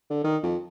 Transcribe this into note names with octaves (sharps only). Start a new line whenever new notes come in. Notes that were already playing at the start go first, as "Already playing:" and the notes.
D3
D#3
F2